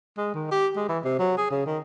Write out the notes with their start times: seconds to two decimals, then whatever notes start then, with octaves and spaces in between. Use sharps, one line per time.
0.17 G#3
0.35 D#3
0.51 G4
0.76 G#3
0.89 E3
1.04 C3
1.19 F#3
1.37 G#4
1.51 C#3
1.66 D#3